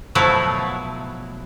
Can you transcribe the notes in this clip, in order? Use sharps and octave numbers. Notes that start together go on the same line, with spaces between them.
B2 F3 F#3 A3 E4